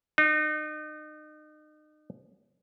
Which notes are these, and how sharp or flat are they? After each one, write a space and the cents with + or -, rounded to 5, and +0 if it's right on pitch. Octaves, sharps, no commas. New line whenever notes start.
D#4 -35